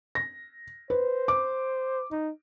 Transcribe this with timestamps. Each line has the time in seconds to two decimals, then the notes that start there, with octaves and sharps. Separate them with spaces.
0.15 A#6
0.90 B4 C5
1.28 D6
2.11 D#4